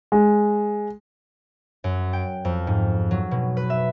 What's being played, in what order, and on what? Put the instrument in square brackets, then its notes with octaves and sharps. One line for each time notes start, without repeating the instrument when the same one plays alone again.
[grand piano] G#3
[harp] F#2
G5
F2
G#2
F#3
B2
B4
E5